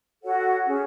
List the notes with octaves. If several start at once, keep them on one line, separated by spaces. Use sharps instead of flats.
F#4 A4 C#5 F#5
C#4 G#4